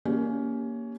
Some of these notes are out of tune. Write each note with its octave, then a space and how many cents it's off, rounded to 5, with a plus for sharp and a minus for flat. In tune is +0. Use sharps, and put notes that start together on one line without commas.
A#3 +0 C#4 +15 G4 +0